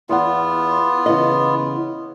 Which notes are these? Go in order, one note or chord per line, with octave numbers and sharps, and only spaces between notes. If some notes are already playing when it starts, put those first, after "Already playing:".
E2 B3 F4 F#5
C#3 E3 D#5